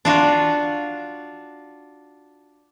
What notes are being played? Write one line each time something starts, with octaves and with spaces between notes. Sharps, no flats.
D4 F4 F#4